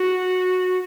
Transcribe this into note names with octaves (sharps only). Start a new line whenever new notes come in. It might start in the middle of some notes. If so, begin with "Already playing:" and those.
Already playing: F#4